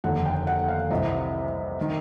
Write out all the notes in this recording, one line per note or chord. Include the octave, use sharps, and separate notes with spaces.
F1 D#2 D3 F#5
G5
F#5
F5
C2 C3 E3 D#5
D#3